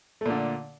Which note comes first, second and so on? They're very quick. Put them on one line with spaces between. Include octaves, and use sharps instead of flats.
A3 A#2 D3